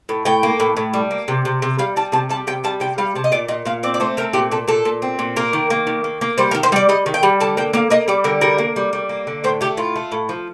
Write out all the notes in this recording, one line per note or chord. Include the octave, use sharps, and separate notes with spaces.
A2
A2 G5
A#3
A2
A2
G3
A#3
C3
C3
C3
G3 F5
G3 A5
C3 A5
G3 A5
C3 G5
G3 A5
C3 G5
G3 F5
C3 A5
D#5
A#2 D5
A#2 D#5
A#2 F5
C4 D5
D5
A3 C5
C4 A#4
A#2 G4
A#2 A4
A#2 A4
A#2
C4
A#2
A#3 A#4
D#3
A#3
D#3
A#3
A#3
G3 C5
A#4
D#3
C5
G3 D5
G3 D#5
D#3
G5
G3
D3 A5
A#3 G5
A#3 F5
A#3 D#5
G3 D5
D3 A#4
G3 A#4
A#3
G3
G3
A#3
D3
A2 C5
A3 G4
A2 F4
A3
A2
F3